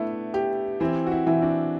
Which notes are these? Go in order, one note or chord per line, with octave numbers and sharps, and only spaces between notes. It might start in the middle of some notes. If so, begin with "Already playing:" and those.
Already playing: A3 B3 D4 E4
G4
E3 C4 E4
F#4
C4 E4
E3
D4 F#4